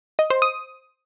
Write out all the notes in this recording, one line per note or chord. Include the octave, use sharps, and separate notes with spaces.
D#5
C5
D#6